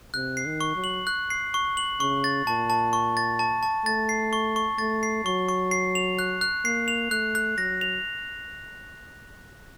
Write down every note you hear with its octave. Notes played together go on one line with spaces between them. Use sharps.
C3 F#6
C7
D#3
C#6
F#3
F#7
F#6
C7
C#6
F#7
C#3 C#6
A6
A#2 A5
A5
C#6
A6
A5
A5
A3 A6
C7
C#6
C#6
A3 A6
C7
F#3 C#6
C#6
C7
F7
F#6
F#6
A#3 C7
F7
A3 F#6
F#6
F#3 A#6
F7